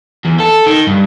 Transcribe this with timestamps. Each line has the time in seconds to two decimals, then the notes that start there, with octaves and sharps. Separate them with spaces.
0.25 E2
0.40 A4
0.66 D#3
0.87 G2